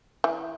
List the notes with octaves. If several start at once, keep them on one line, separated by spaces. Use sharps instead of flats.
E3